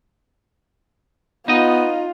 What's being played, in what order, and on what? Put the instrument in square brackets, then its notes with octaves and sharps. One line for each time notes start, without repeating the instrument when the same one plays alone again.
[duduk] B3 [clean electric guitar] D#4 D#5 [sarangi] F4